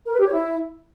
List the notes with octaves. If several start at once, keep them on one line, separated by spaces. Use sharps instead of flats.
A#4
B4
G4
C#5
E4